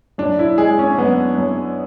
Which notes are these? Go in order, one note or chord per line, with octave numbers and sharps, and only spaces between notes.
F#2 D4
E4
G#3 G#4
C#4
F#2 B3
F#2